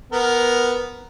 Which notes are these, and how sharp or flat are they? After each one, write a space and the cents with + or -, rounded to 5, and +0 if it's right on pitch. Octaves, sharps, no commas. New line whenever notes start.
B3 +0 A#4 +10